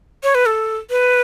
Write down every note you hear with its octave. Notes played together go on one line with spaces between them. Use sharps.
C#5
B4
A4
B4